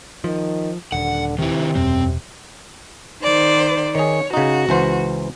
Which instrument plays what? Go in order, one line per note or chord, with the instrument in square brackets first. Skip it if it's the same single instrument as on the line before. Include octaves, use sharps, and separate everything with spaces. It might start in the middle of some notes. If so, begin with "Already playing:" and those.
[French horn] D#3 [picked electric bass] F3
[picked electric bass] D#1 [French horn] D3 [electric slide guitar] F#5
[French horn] C3 [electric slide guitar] D#3 E4
[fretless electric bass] E1 [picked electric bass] F#2 [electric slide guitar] C4
[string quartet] D#3 C5 D5
[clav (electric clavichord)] D#3 G#4 [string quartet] C#5
[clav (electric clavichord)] C#3 D#4 [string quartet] F#4
[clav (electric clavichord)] C#2 E3 C5